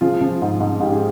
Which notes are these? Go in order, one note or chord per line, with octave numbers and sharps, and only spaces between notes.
F3 F4 G#4
F3
G#2
G#2
G#2 G4
G#4